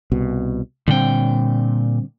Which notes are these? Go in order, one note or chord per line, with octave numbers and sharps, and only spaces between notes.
C2 B2
A#2 D3 G3 C4 G5